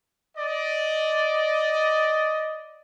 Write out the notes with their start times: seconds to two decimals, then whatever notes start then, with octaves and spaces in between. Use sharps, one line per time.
0.38 D5 D#5